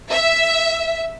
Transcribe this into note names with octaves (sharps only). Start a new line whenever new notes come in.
E5